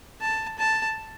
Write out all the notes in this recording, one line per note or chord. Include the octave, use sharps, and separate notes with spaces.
A5
A5